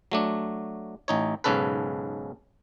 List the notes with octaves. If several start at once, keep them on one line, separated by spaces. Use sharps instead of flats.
F#3 A3 D4
A1 D#4 C#5
B1 G#2 C#3 C#4 A4 B4